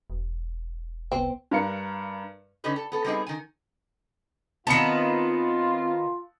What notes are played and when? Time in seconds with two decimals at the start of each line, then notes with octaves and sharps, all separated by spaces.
0.10 E1
1.12 C2 B3 C4
1.51 G2 A#4 F5 C#7
2.64 D3 C#4 D#4 G4 B4
2.76 A4
2.92 B3 A4
3.05 G3 B3 C4 D#4 G#4
3.27 D#3 G#5
4.67 D#3 B3 C4 F4 A5 C#7